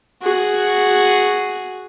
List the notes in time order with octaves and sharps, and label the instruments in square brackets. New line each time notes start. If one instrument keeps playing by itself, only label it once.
[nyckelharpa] F#4 G#4